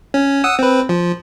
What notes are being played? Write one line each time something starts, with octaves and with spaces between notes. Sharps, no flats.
C#4
F#5 D#6 E6
C4 B4
F3